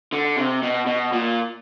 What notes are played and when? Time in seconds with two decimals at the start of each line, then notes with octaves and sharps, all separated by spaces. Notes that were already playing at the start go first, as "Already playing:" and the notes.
0.13 D3
0.37 C3
0.63 B2
0.87 B2
1.13 A#2